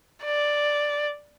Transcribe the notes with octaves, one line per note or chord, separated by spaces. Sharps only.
D5